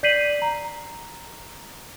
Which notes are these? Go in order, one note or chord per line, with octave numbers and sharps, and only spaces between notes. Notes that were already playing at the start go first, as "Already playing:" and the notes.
D5 G6 B6 C7 D#7 F#7
A#5